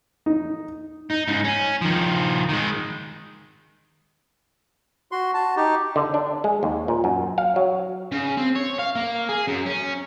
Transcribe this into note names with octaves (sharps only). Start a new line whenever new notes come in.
D#4
D#4
G#2 C#3
C#4
D#3 F3
D#3 G#3
F#4 C6
F#4 A5
D#4 G4
D3
D4
G#3
D#2
A#2
F#2
F5
F#3
C#3
C4
C#5
F5
A#3
G#4
F#2
C#4